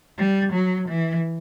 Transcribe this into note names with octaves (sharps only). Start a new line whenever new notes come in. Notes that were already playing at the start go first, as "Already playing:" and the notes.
G3
F#3
E3